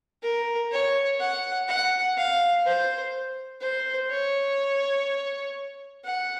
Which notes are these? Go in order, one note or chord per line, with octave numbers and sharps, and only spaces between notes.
A#4
C#5
F#5
F#5
F5
C5
C5
C#5
F#5